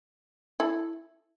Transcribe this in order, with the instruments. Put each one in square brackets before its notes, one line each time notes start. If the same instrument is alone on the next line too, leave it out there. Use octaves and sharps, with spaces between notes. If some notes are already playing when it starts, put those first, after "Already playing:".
[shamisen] E4 A4